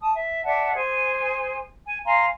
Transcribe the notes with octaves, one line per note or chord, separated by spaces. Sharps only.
A5 D#6
E5
D5 E5 F#5 A5
G#4 C5 G#5
G#5
F5 G#5 A#5 C6